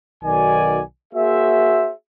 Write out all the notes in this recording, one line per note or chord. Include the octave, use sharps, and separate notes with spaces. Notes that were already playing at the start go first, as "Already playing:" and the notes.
B1 D#3 F#4 D5 G#5
A#3 F#4 G#4 C5 E5